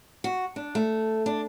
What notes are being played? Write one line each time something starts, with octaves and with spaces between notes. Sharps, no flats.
F#4
D4
A3
D4